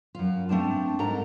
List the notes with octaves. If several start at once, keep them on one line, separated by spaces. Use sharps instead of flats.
F#2 F4
A3 C4 D4 A5
G#2 A4 A#4 A#5